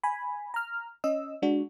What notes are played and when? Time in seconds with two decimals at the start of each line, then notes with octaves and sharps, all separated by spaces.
0.04 G#5 B5
0.54 A#5 F6
1.04 C#4 D#5 E6
1.42 G#3 D4 F#4